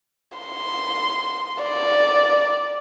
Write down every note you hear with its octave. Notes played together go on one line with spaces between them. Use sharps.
C6
D5